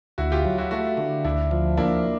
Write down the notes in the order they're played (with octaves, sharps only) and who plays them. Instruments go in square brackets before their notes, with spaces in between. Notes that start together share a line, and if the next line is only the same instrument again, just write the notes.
[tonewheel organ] D2 [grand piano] E4 F#4
[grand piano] F4 G4
[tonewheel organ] F#3
[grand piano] E4 F#4
[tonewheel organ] A3 [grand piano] E4 F#4
[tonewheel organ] D3
[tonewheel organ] D2 [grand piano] D4 E4
[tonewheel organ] F3
[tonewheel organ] A#3 [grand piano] D4 E4